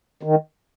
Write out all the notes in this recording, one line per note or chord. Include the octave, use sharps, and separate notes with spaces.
D#3